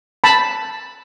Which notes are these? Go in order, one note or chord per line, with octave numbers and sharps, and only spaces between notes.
A5 B5